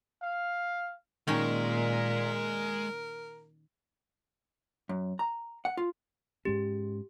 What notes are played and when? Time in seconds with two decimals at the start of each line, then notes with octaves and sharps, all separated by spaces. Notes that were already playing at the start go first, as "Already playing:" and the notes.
0.23 F5
1.27 A#2 D#3 G#3 C#4 A#4
4.89 F#2
5.19 A#5
5.65 F#5
5.77 F4
6.45 G#2 G#3 C#4 G4